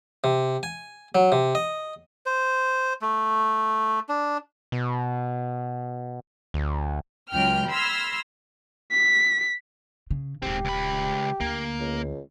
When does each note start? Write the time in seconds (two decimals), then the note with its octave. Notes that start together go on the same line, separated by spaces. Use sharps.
0.24 C3
0.63 G#5
1.15 F#3
1.32 C3
1.55 D#5
2.26 C5
3.02 A3
4.09 D4
4.72 B2
6.54 D2
7.32 C#2 F#3 G5 F6
7.69 B5 C6 E6 F6 G#6 A#6
8.92 B6
10.11 C#3
10.43 D#1 G#2 C#3 C4 G4
10.65 C#2 B5
11.40 D2 A#3
11.80 C#2